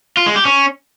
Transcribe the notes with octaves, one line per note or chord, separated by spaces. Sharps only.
F4
G#3
G4
C#4